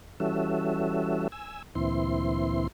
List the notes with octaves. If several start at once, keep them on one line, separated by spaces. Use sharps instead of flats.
E3 G3 C#4 F#4 A4 E5
G#5 E6
D2 A#2 E3 C4 E4 C6